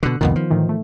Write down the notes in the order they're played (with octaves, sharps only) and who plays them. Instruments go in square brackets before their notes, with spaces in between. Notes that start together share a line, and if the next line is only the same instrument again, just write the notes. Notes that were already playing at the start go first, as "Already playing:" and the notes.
[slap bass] B2 D3 [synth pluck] F#6
[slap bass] C2 F2 A#2 [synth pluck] D#3 B3
[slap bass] F3
[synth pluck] A2 D#3 E3
A3